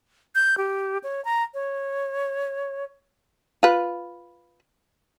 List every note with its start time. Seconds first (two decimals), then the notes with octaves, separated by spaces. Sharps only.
0.35 G6
0.58 G4
1.03 C#5
1.25 A#5
1.54 C#5
3.63 F4 B4